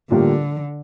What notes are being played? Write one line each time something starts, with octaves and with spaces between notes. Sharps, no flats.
A2 D3 G3 A#3 F4